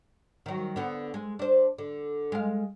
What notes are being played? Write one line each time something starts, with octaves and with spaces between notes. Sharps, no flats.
D#3 F#3
D3 B3
G#3
D4 C5
D3
G#3 F5